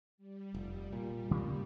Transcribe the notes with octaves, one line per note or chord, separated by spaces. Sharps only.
G3
F1
A#2
C#3 A#3